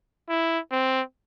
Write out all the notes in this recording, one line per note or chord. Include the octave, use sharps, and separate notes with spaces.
E4
C4